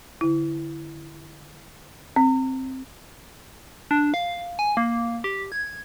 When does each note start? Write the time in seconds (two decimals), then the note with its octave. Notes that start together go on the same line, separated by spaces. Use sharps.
0.21 D3 E4
2.16 C4
3.91 D4
4.14 F5
4.59 G#5
4.77 A#3
5.24 G4
5.52 G#6